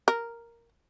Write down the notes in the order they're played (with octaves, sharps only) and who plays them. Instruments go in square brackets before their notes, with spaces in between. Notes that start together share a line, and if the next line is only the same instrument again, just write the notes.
[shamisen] A#4